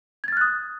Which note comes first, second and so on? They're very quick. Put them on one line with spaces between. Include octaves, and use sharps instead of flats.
G#6 A6 F6 F#6 D#6